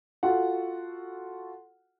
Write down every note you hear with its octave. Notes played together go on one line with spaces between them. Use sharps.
F4 F#4 A4 F#5